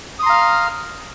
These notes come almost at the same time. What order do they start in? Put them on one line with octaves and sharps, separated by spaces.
D#6 C6 A#5 F5 F6